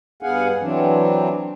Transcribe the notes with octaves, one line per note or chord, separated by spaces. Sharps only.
G2 B3 G#4 F5 F#5 G#5
E3 F#3 C4 D4